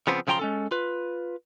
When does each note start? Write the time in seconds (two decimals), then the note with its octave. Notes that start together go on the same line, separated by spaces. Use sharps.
0.07 C#3 F3 B3 C4
0.27 B1 C#3 F3 G5 A#5 C6
0.39 G#3 C#4 A4
0.71 F4 B4